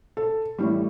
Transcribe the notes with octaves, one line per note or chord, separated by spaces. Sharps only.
A4
A1 A2 G3